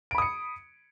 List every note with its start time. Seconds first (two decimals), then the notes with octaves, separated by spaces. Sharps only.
0.11 D7
0.15 B5
0.18 D#6
0.22 C#7